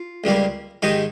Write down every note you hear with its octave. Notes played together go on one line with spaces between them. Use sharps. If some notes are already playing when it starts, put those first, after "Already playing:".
Already playing: F4
C#2 C#3 G3 A#3
G#2 D#3 G#3 D#4 G4